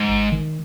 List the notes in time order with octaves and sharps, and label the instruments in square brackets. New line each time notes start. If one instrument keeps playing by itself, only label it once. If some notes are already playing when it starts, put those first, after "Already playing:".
Already playing: [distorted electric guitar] G#2
[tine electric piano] G#1
D#3